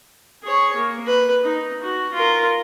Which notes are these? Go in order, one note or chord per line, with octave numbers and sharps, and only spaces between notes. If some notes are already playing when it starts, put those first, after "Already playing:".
G#4 C#5
A#3
B4
D#4
F#4
F4 A#4